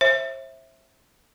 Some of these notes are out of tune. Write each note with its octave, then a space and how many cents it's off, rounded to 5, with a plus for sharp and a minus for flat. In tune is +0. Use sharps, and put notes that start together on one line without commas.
C5 +40 E5 -5